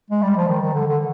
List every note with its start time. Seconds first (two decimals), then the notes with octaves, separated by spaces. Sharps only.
0.11 G#3
0.23 G3
0.37 F3
0.48 D#3
0.62 D#3
0.74 D3
0.88 D3